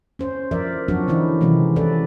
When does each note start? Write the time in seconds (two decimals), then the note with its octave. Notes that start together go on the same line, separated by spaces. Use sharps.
0.19 C#4 C5
0.51 F3 A#4 D5 E5
0.88 F3 F#3 C4 D4 F#4
1.08 D3 E3 C#4 D#4 E4
1.41 C3 D#3 E3 F#3 G#3 C4
1.76 C#4 E4 A4 B4 D5